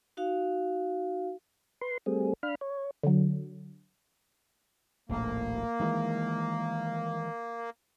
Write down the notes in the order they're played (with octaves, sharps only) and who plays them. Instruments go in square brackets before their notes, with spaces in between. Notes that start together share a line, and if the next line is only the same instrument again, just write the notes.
[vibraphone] D#4 F#4 F5
[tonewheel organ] B4 C6
G3 A3 C4 G#4
D4 F5 B5 F6
C#5
[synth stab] D3 F#3
[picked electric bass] D#1 A#1 A2 [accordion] A#3
[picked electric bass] D#3 E3 G#3